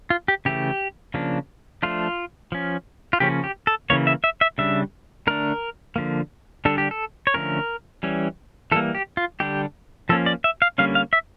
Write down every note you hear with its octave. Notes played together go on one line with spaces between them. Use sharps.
F4
G4
C#3 E3 A3 G4
C#3 F3 A#3 D4
F3 A3 D4 F4
F3 C#4
F4
C#3 F3 A#3 C#4 G4
G4
A4
C#3 E3 A#3 C#5
E5
E5
E5
C#3 G3 D4 E5
D3 A3 D4 A#4
D3 F3 A#3
D3 G3 D4 A4
G4
A4
C#5
D3 F3 A3 C#4 A#4
E3 G3 C#4
E3 G3 A#3 A4
G4
F4
D3 G3 D4 G4
F3 A#3 C#4 A4
D5
E5
F5
D3 G3 A#3 C#4 F5
F5
E5